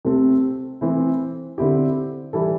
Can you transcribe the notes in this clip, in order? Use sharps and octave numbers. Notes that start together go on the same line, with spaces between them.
C3 A3 C4 A4
E3 A3 C4 E4
D3 C4 E4 G4
E3 G3 E4 A4